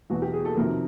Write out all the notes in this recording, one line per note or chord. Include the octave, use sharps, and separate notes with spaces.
E2 B2 F#3 F#4
G4
G#4
A4
F2 C3 D#3 F#3 A#4